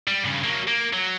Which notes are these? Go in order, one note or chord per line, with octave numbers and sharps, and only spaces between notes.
G3
G2 C#3
F#3 A#3
A#3
F#3